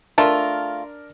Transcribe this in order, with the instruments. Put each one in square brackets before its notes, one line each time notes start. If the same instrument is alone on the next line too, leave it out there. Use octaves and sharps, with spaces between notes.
[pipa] A3 F4 [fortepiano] D4 A#4